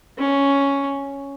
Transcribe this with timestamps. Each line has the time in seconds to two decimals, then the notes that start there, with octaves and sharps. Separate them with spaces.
0.18 C#4